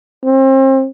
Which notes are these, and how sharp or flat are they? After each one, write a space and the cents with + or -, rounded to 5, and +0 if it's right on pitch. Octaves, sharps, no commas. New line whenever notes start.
C4 +35